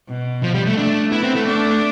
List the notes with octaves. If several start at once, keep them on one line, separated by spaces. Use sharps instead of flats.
B2
F3
G3
A3
A3 D4
B3 E4
C4
A3
D4